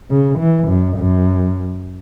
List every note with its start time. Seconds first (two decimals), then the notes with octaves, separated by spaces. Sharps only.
0.10 C#3
0.39 E3
0.68 F#2
0.97 F#2